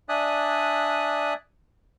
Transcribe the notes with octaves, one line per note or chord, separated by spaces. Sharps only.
D4 D5 E5 G#5 D#6 F#6